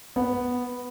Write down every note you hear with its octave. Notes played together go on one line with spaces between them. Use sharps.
B3